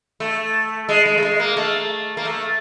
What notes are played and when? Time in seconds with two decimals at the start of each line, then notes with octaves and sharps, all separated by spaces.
0.20 A3
0.89 G#3
1.05 G#3
1.17 A3
1.23 G#3
1.40 A#3
1.57 A3
2.17 A#3
2.25 A3